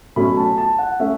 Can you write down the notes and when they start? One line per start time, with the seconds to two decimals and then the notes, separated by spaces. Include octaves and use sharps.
0.16 B2 F#3 A3 C#4 B5
0.37 A5
0.58 A5
0.78 F#5
1.00 A3 C#4 E5